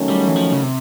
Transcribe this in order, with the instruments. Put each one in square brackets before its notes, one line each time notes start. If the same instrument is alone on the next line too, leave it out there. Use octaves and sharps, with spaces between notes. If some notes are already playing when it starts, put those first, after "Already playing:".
Already playing: [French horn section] D#3 F#3 A3 C#4
[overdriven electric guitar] G3
E3
F3
C#3
C3